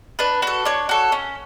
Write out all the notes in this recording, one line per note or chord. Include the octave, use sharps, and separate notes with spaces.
D4 B4
F#4 A4 B4
D4 C#5
F#4 A4
C#4